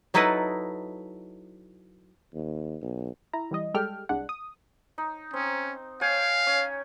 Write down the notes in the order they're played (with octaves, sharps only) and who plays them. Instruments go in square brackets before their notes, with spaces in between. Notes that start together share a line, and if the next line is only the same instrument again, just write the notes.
[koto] F#3 D#4 E4 A4 B4 D#5
[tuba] D#2
B1
[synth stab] E4 A#5
E3 G3 D#5
G3 G#3 G4 A4 G5 F6
C2 G#3 D4 F#5
D#6
[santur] D#4
[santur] C4 [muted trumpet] C#4
[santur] C#5 G5 G#5 [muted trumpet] F5
[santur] C#4